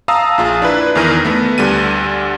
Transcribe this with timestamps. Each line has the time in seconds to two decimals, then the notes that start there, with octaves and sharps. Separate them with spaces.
0.08 F5 A5 A#5 D#6 E6
0.38 A#1 F4 G#4
0.62 D4 E4 B4
0.95 E2 D#3 E3 A#4 A#6 D#7
1.25 A3 B3
1.58 D2 D3 G3 D#7